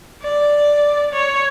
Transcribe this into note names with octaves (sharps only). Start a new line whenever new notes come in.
D5
C#5